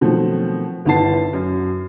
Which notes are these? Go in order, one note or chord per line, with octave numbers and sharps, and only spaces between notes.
B2 D#3 F3 F#3 A3 C4
G1 D#3 B3 E4 A5 C7
F#2